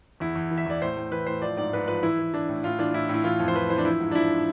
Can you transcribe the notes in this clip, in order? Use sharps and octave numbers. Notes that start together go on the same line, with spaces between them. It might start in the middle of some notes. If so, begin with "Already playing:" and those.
E2 E4
E2
E3
E5
E2 D5
A2 C5
A2
E3 B4
A2 C5
F3 D5
G#2 D5
G#2 B4
F3 B4
E3 E4
E3
E3 D4
A2
A2 F4
E3 D4
A2 E4
A2 E4
E3 F4
F2
C5
E3 B4
E3 C5
D4
F3 E4
G#2
D4
F3 E4